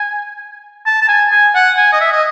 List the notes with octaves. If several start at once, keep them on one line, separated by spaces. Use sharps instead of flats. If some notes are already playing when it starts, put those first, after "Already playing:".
Already playing: G#5
A5
A5
G#5
G#5
F#5
G#5
D#5
E5
D#5